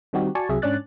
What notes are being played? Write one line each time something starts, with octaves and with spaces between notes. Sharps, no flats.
D#3 G3 C4 D#4 F#4 G4
F#4 D5 G#5 A5 C#6
C2 C3 F#3 G#4 E5
G#2 C#4 D4 D5 F#6 A6